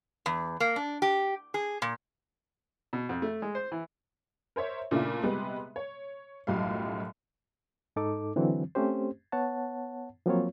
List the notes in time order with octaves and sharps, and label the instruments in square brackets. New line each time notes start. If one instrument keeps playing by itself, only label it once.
[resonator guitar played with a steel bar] E2
A#3
D4
G4
G#4
A#2
[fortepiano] B2
F2
A3
G#3
C5
E3
[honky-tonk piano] A#4 C5 C#5 E5
A#2 C#3 A3 D4 E4 F4
C3 G3 G#3 B3
C#5
B1 F#2 A2 F3 G3 F5
[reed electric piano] G#2 D#4 A4 D6
D3 E3 F#3 C4
A3 C4 C#4 G4 C5
B3 C#5 F#5 A5
F3 F#3 A#3 C4 F4 C#5